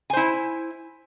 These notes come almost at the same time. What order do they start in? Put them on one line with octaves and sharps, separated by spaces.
G#5 C5 E4